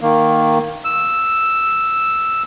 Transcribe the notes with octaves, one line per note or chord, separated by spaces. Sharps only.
D#3 A#3
E6